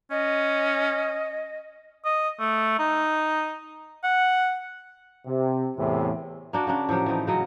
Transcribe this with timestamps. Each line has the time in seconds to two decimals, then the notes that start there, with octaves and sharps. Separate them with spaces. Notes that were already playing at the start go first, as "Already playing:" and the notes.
0.11 C#4 D#5
2.05 D#5
2.39 A3
2.79 D#4
4.04 F#5
5.27 C3
5.77 E2 A2 C3 E3
6.53 A#3 D4 F#4
6.67 C#3 A#3 D4
6.89 A2 F3 F#3 G4
7.06 E3 F3 D#4
7.27 C#3 F#3 D#5